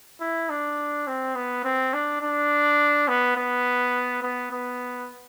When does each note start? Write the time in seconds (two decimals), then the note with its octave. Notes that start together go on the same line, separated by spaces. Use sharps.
0.21 E4
0.50 D4
1.07 C4
1.36 B3
1.64 C4
1.94 D4
2.22 D4
3.08 B3
3.36 B3
4.22 B3
4.51 B3